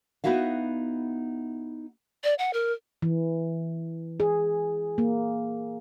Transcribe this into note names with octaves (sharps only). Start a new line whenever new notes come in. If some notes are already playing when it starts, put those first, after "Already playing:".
B3 D#4 E4 F#4 E5 F5
D5
F#5
A#4
E3
G#4
A#3